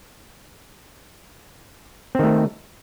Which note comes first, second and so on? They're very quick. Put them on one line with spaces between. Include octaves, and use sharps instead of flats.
C4 D#3 A3